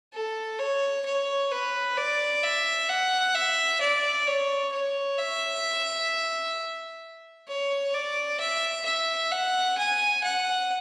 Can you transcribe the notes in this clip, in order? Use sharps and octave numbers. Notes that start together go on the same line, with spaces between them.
A4
C#5
C#5
B4
D5
E5
F#5
E5
D5
C#5
C#5
E5
C#5
D5
E5
E5
F#5
G#5
F#5